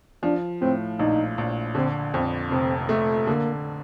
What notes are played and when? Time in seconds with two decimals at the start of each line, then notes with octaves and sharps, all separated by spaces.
0.23 F3 D4
0.62 A2 C4
0.99 A#1 D#4
1.38 A#1
1.75 D3 C4
2.14 F2 C4
2.51 F1 C4
2.89 A3
3.27 D3 A#3